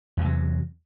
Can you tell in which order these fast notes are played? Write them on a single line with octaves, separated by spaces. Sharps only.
E2 C3 F#3